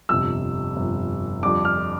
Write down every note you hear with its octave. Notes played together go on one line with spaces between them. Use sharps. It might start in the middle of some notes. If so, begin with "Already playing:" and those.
G1 F2 C3 E6
G1 F2 C3
F2 D3 G3 D4 D6
F6